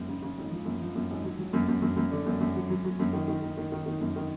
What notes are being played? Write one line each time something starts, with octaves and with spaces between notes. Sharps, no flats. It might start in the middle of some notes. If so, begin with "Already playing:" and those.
Already playing: G#1 F#2
C#3
C#3
G#1
F3
F#2
F3
F#2
G#1
F#3
F#3
F#2
F#2
F#2
F#2
D3
F#2
F#2
F#3
F#3
F#3
F#2
D#3
D#3
D#3
D#3
D#3
D#3
F#2
D#3